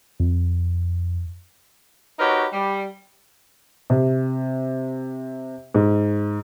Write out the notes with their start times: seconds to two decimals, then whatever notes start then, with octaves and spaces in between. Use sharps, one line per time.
0.20 F2
2.19 D#4 F#4 G4 A#4 B4 C#5
2.52 G3
3.90 C3
5.74 G#2